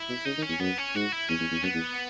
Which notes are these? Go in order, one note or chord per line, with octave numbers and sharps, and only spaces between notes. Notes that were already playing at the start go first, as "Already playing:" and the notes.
Already playing: E4
B2
C#3 D#4
D#3
C#4
E2
F#2 B3
C#4
G#2 F#4
E4
E2 C#4
E2
E2
F#2 B3
E2